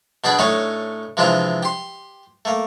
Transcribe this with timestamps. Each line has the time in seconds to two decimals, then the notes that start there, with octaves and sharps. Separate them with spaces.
0.24 B2 D4 G#4 D5 B5
0.39 A2 A3 D4 D#4 C#5 G#5
1.17 C3 E3 F3 G#3 D4 F4
1.63 G4 C6
2.45 A3 A#3